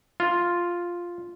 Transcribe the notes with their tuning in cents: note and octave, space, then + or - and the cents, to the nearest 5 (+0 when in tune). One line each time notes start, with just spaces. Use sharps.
F4 +0